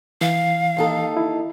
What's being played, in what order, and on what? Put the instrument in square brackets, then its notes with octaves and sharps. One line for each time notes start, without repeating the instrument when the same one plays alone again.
[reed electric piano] E3 [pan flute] F5
[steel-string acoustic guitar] D#2 D#4 A4
[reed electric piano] E4